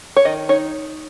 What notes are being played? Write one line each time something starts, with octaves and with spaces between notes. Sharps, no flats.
C#5
D#3 D#5
D#4 C#5